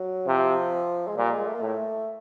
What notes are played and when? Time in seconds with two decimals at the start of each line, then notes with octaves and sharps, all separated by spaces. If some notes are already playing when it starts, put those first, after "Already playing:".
Already playing: F#3
0.27 C3 F3
1.08 G#3
1.17 A#2 G3
1.32 G#3
1.46 A3
1.55 A#3
1.61 A2 A3